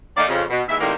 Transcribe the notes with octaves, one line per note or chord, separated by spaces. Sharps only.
D#3 A3 A#3 D#4 D5
F2 C#3
B2
D#2 E3 G#3 E5
A2 C3 D#3 G3 G#3 A#3